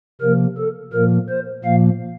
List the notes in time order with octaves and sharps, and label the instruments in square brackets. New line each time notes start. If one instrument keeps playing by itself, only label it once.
[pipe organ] C3 F3 A#3 A#4
A4
A#2 F3 A#3 A#4
C5
A#2 F3 A#3 F5